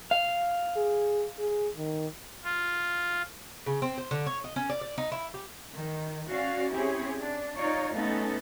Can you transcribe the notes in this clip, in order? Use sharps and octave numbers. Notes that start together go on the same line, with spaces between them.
F5
G#4
G#4
D#3
F4
C#3
C4
C5
D3
C#5
D#5
C#4
D5
D5
D#4
E4
G4
D#3
C#4 F#4 D5 F5
C4 C#4 E4 G4 G#4 C#5
D4
D#4 F4 C#5 D5 F5
A3 B3 C#4 D#4 A4